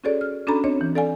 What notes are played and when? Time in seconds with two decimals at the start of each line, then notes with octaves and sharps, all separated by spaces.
0.04 C#4 F#4 G#4 A4 C#5 D5
0.21 F6
0.47 C#4 D4 F#4 A4 A#5 B5
0.64 C4 D4 C#5 D#5
0.81 E3
0.95 A4 D5 F5 G#5